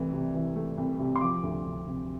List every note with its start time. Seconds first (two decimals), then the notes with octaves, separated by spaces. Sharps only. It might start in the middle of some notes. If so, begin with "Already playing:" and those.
Already playing: C2 E3 A3
0.12 C3
0.34 E3
0.56 A3
0.78 C2
0.99 C3
1.16 C6
1.21 F3 D6
1.43 D2
1.65 D2
1.87 C3